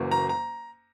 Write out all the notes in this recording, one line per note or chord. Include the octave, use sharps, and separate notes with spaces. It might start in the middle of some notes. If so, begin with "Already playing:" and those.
Already playing: F#1 F#2 E3 A#3
A#5
A#5